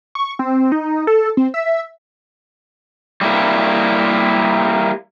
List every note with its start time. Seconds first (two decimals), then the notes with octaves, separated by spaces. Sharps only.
0.15 C#6
0.39 C4
0.72 D#4
1.07 A4
1.37 C4
1.54 E5
3.21 G3 A#3 E4